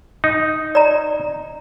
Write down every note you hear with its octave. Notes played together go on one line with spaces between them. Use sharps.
D#4
D5 A#5